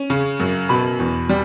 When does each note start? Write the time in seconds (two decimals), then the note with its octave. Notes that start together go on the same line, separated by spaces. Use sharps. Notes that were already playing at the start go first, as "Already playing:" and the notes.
Already playing: C#4
0.10 C#3
0.40 F#2
0.69 B2 B5
0.99 E2
1.29 G3